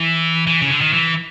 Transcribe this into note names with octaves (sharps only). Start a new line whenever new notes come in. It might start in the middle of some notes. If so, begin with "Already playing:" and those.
Already playing: E3
E3
C#3
D3
D#3
E3